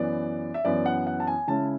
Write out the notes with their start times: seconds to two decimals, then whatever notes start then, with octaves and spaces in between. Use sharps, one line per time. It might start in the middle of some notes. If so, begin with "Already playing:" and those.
Already playing: F#2 E3 B3 D5
0.54 E5
0.65 F#2 E3 B3 D5
0.86 F#5
1.07 F#5
1.20 A5
1.27 G#5
1.48 C#3 G#3 C#4 E4 A5